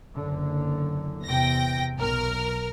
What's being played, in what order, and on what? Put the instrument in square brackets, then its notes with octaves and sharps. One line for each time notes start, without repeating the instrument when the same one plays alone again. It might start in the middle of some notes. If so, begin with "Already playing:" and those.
[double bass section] F#1 D3
[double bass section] E2 C3 [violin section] G5 A#6
[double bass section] B1 [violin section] A#4 F6